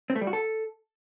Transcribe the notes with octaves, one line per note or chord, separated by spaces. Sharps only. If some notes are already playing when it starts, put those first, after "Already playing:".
C4
A3
G3
F#4
A4